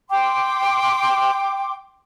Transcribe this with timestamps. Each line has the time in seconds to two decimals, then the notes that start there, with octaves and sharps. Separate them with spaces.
0.09 G5 C6 D6